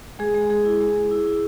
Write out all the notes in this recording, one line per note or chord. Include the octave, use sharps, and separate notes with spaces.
G#3 G#4
G#3
G#3 G#4
E4
G#3
E4
E4
E4